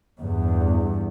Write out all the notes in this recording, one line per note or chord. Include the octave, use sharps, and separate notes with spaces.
E2 G2